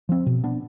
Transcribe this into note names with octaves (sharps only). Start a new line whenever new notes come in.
F3 C4
B2
B3 D4